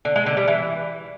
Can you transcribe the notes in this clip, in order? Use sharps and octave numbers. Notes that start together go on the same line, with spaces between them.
D3
G#3
D3
G3
E3